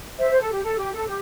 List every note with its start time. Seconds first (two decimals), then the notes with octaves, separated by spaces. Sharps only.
0.18 C5 E5
0.30 C5
0.40 A4
0.51 G4
0.63 A4
0.77 G4
0.92 A4
1.07 G4